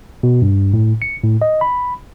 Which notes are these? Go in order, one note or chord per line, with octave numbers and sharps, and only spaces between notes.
B2
G2
A2
C#7
A2
D#5
B5